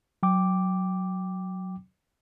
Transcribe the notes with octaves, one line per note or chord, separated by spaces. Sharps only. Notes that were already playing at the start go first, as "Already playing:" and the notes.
F#3 G5 D6